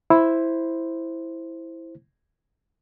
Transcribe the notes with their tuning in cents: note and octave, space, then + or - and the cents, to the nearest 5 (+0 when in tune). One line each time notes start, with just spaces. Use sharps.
E4 +0 C5 +0